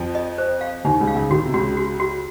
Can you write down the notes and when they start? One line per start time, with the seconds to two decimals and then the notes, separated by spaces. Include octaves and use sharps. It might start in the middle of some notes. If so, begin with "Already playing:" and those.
Already playing: F2 F3
0.15 D#5
0.38 C5
0.61 F5
0.85 D#2 D#3 D#4
1.00 C#2 C#3
1.07 F5
1.15 C#2 C#3
1.31 D#3 F#4
1.38 C#3
1.46 C3
1.53 C#2 C#3 F#4
1.77 F#4
2.00 F#4